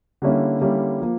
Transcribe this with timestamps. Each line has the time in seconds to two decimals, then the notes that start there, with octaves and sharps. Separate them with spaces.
0.22 D3 G3 A#3 C#4 E4
0.60 D3 G3 A#3 C#4 E4
1.00 F3 A#3